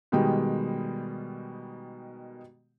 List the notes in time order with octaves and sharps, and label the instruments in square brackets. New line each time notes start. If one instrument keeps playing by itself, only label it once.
[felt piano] B2 D#3 G3 G#3 G5